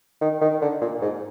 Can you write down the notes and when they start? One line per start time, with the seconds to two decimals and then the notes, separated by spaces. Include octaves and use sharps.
0.21 D#3
0.41 D#3
0.61 D3
0.81 A#2
1.02 G#2